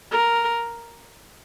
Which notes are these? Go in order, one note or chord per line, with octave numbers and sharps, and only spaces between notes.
A#4